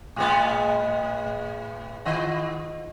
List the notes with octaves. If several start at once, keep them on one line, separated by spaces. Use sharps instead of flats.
A2 G#3 B3
D#3 F4 D#5